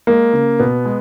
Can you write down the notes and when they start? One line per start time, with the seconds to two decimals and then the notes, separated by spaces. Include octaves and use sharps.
0.07 G#3 A#3
0.33 C#3
0.59 B2 B3
0.85 G#3